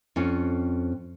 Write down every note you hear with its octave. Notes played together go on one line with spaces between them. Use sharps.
F2 C4 C#4 F4